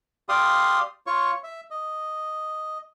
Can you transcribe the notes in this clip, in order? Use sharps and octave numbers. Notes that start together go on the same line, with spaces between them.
G4 D5 F5 C6 D#6
F4 C#5 C#6
E5
D#5